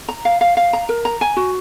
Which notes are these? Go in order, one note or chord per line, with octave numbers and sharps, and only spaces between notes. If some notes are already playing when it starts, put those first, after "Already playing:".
A#5
F5
F5
F5
A#5
A#4
A#5
G#5
F#4